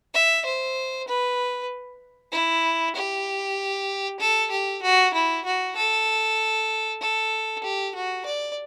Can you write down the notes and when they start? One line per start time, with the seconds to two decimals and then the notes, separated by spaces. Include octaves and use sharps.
0.14 E5
0.45 C5
1.08 B4
2.32 E4
2.96 G4
4.20 A4
4.51 G4
4.82 F#4
5.14 E4
5.45 F#4
5.76 A4
7.01 A4
7.64 G4
7.95 F#4
8.25 D5